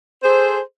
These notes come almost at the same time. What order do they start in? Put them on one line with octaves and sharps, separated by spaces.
C5 G#4 A4